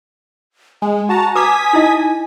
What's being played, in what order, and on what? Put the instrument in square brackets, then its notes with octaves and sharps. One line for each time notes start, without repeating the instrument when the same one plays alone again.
[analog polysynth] G#3 [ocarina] G#5
[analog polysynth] F#4 A5 A#5
[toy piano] B4 D6 [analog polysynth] D#6 G#6 B6
[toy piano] D#4 E4 D#5